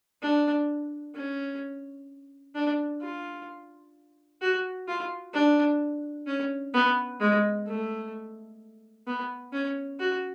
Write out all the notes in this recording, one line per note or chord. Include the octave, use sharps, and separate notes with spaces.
D4
C#4
D4
F4
F#4
F4
D4
C#4
B3
G#3
A3
B3
C#4
F#4